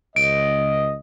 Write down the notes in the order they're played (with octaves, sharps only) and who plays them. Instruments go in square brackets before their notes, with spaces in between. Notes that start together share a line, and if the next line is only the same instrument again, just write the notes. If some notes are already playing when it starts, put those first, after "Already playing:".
[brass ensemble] C#2 D#5 [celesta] D7